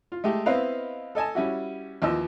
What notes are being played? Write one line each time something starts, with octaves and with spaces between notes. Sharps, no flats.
F4
G#3 A3 G4
B3 C4 E4 B4 D#5 F5
A4 D#5 G#5 A5
G3 C#4 E4 F#4
D#2 E3 F3 D#5 E6